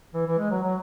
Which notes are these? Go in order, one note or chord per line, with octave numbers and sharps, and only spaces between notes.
E3
E3
G#3
F#3
F#3